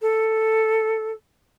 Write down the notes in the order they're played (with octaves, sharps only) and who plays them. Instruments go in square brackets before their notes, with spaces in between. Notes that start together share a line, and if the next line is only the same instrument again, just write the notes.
[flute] A4